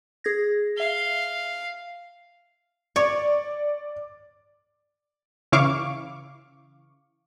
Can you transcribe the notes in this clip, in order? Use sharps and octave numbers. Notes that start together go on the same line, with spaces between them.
G#4 G#6 A#6
E5 F5 G7
C#5 D5
C#3 E3 E4 F5 C#6 D6